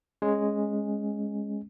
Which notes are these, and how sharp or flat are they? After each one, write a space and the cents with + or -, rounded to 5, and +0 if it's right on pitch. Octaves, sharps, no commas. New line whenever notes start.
G#3 +0 C#4 -10